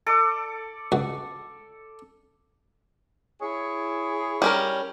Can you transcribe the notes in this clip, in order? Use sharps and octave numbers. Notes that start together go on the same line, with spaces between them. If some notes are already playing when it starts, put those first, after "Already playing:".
A4 D5 D6
C#2 F#4
E4 G#4 C#5
G3 C#4 A#4